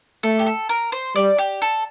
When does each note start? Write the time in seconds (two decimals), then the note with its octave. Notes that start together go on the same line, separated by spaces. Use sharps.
0.23 A3 A4
0.39 G4
0.46 A4
0.69 A#4
0.92 C5
1.15 G3 D5
1.38 G4
1.62 A4